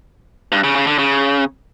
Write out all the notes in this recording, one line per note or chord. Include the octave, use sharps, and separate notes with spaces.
G2
C#3
C#3
D3
C#3